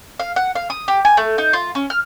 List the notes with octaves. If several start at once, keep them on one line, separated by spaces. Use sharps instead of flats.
F5
F#5
F5
D#6
G4
G#5
A3
D#4
F4
C#4
F6